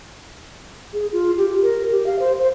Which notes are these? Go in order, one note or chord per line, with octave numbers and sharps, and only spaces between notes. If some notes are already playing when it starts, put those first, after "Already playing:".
G#4
F4
G4
A#4
G4
F5
C5
C5